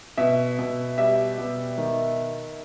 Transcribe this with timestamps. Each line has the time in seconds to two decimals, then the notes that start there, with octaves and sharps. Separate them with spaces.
0.17 B2 E5
0.59 B2
0.98 G3 E5
1.38 B2
1.78 D#3